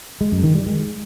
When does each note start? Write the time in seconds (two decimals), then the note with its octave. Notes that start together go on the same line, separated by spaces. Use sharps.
0.21 G#3
0.32 F#2
0.44 D#3
0.55 G3
0.66 G#3